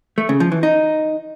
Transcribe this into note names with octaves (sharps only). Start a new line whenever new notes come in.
A3
C#3
F3
E3
D#4